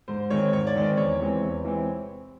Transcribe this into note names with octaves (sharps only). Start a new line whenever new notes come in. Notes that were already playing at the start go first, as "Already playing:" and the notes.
G#2 C5
D#3 G#3 C4 C#5
G#2 C#5
D5
D#3 G#3 C4
D5
E2 C#5
C3 E3 G#3 C4
E2
C3 E3 G#3 C4